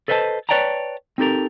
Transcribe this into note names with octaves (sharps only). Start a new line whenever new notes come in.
A4 B4 C5 D#5 G#5 A5
B4 C#5 D5 G5 A5 A#5
C4 D#4 G4 A4 A#4